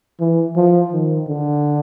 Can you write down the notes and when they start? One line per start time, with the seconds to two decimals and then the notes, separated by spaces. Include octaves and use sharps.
0.20 E3
0.56 F3
0.92 D#3
1.28 D3